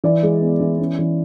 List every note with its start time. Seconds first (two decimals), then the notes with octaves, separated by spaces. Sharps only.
0.04 E3 D5
0.23 G#3
0.41 B3
0.60 E3
0.79 C#4
0.99 E3